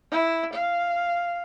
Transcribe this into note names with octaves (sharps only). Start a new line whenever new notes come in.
E4
F5